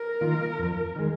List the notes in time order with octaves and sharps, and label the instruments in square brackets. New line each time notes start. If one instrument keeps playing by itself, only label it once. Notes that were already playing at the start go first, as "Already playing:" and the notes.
Already playing: [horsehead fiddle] A#4
[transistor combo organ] D#3 A#3 F4
F2
D#3 G#3